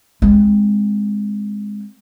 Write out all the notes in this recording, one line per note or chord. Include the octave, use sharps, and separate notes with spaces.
G#3 C4